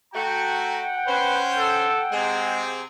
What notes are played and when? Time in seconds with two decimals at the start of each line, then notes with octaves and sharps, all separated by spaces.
0.14 A3 F#4 F#5 G5 A#5
1.07 C#4 B4 C5
1.58 A4
2.13 C3 G#3 C4 G#4